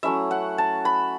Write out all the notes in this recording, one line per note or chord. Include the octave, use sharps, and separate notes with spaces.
F#3 A3 C#4 E4 E5
F#5
A5
B5